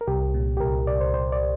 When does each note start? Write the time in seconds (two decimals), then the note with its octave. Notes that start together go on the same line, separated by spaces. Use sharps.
0.01 A#4
0.07 C2 G4
0.34 A#2
0.57 G4
0.60 C2 A#4
0.87 C2 D5
1.01 C5
1.14 C2 C5
1.32 D5